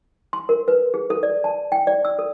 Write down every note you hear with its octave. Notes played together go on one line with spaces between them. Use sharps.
C6
A#4
B4
G#4
A4
D5
A5
G5
D5
E6
A4